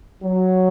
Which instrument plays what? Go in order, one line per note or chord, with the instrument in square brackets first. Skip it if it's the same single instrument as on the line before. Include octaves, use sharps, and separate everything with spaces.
[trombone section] F#3